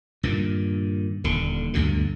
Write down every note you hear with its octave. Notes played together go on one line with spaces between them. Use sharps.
G2 A#2 D#3
D#1 D3
D2 G2 B2 D3